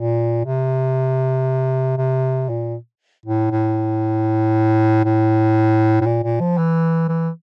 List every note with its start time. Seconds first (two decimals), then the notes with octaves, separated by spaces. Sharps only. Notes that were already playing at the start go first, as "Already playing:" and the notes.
Already playing: A#2
0.45 C3
1.98 C3
2.49 A#2
3.26 A2
3.51 A2
5.05 A2
6.01 A2
6.06 A#2
6.23 A#2
6.40 F3
6.58 E3
7.09 E3